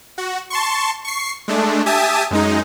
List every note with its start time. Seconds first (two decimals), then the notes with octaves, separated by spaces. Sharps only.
0.18 F#4
0.50 A5 C6 C#6
1.05 C#6 C7
1.48 G#3 A3 D4
1.86 G4 E5 G#5 A5 D#6
2.31 F#2 G#3 D#4